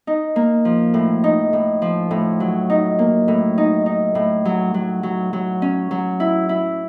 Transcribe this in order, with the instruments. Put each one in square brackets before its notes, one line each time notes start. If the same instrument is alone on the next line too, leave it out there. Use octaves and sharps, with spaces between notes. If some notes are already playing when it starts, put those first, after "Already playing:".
[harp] D#4
A#3
F3
A2
D#4
A2
F3
A2
F#3
D#4
A#3
A2
D#4
D#4
A2
F#3
F#3
F#3
F#3
C#4
F#3
E4
E4